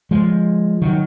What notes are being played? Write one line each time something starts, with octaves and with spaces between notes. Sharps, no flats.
F3 G#3
D#3 F#3